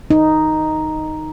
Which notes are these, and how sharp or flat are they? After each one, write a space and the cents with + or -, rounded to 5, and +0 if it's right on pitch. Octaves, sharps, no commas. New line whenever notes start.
D#4 +0